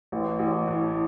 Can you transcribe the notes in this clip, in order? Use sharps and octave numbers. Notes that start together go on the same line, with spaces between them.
A1
A1
A2